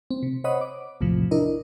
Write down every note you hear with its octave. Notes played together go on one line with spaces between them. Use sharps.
C4
C3
C5 C#5 D#5 F#5 B5 D#6
D6
A#1 E2 A2 C3 F3
D4 E4 A#4 D#5